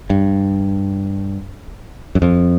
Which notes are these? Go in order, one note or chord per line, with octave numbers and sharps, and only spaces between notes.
G2
F#2
F2